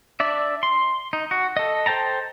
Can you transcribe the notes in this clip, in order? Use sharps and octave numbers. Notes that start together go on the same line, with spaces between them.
D4 D5 E5
C6
D#4
F#4
A4 D#5
A4 C5 G5 A5 A#5